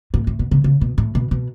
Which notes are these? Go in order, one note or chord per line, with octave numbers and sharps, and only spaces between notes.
A2
A2
B2
C#3
C#3
B2
A2
B2
B2